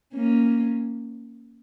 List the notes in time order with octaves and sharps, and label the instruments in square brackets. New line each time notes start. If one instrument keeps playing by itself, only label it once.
[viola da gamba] A#3 C#4